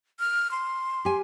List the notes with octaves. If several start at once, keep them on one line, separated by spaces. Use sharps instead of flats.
F6
C6
G4 G#5